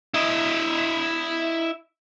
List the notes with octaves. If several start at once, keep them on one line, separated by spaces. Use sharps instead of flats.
E4 D#5